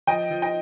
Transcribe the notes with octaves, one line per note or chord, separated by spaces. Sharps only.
F3 D#5 G5
F3
D#5 G5